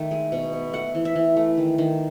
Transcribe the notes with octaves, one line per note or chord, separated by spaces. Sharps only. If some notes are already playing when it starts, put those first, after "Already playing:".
Already playing: D#3 A3
G#3
B2
B3
A3 F#5
E3
E5
E3
A3
D#3
D#3